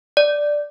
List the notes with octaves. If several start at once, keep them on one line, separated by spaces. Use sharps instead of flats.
D5